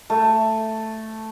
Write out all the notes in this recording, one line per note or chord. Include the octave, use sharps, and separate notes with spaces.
A3